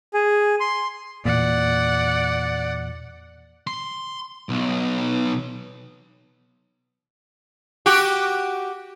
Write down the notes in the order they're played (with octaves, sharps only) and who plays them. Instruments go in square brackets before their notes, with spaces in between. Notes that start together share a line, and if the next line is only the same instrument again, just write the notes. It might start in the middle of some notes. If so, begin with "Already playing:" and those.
[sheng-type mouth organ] G#4
C6
[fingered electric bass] E2 A#2 [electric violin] D5 F#5
[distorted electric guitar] C6
B1
[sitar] F#4 G4